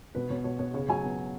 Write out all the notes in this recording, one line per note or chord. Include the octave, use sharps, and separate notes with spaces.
B2 B4
B2 C#5
B2 C#5
B3 C#5
C#3 C#5
F#3 G#5
B3